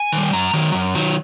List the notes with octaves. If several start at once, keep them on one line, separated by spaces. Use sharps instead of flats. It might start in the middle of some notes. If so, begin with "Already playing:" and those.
Already playing: G#5
D#3
G3
F#2 A#5
D#3 F#3
F#2
D#3 F#3